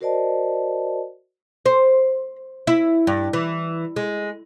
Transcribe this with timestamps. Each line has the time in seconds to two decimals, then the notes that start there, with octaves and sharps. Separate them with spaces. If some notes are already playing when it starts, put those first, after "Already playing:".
0.01 F#4 A#4 C5 D5 D#5 A5
1.65 C5
2.67 E4
3.07 G2
3.33 E3
3.96 G#3